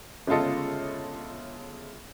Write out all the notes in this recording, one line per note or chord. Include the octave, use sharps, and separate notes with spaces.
G1 C#3 G#3 F4 A4 D#5